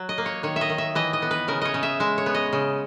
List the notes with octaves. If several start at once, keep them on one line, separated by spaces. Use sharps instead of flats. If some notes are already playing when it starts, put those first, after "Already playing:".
Already playing: F#3
D#5
A#3
C#5
D#3 C#5
E5
D#5
D#3
E5
E3 D#5
D#5
B3
B4
C#3 A#4
C#5 D#5
C#3
E5
G#3 E5
C#5
B3
D#5
C#3